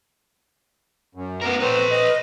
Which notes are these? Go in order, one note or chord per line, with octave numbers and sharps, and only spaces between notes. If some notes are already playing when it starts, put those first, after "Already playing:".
F#2
B3 A#4
C4 B4 C#5
D#5